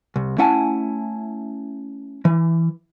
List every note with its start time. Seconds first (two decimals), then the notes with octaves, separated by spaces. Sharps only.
0.16 C2
0.38 A3 C#4 E4 F#5 G#5 A5
2.25 E3